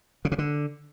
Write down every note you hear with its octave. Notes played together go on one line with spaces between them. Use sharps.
C#3
C3
D3